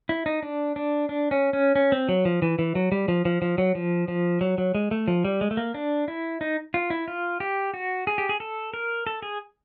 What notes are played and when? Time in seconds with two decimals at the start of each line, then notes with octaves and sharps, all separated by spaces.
0.09 E4
0.26 D#4
0.43 D4
0.76 D4
1.09 D4
1.31 C#4
1.53 C#4
1.76 C#4
1.92 C4
2.09 F#3
2.25 F3
2.42 E3
2.59 E3
2.75 F#3
2.92 G3
3.08 F3
3.25 F3
3.42 F3
3.58 F#3
3.75 F3
4.08 F3
4.41 F#3
4.58 F#3
4.75 G#3
4.91 A3
5.08 F3
5.25 G3
5.41 G#3
5.51 A3
5.57 A#3
5.74 D4
6.08 E4
6.41 D#4
6.74 F4
6.90 E4
7.08 F4
7.40 G4
7.74 F#4
8.07 G#4
8.18 G4
8.29 G#4
8.40 A4
8.74 A#4
9.07 A4
9.23 G#4